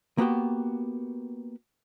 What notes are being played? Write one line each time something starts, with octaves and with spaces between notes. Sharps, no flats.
A#3 B3 F#4 G4